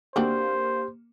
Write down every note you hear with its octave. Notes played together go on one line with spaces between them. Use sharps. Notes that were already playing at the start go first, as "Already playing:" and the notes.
A#3 C4 D4 F#4 G4 C5